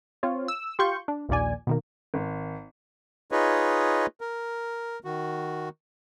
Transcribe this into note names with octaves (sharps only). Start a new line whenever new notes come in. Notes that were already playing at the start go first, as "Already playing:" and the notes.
C4 F4 C#5
E6
F4 G4 C6 C#6 G6
D4
A#1 D#2 A#2 D5 G#5
B2 D#3 A#3
G#1
D#4 F4 G#4 B4 C#5 D#5
A#4
D#3 F#4